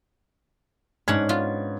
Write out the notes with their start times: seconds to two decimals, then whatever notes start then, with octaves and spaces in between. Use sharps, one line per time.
1.08 G#2 C#4 D4 F#5 G#6
1.29 B3 F4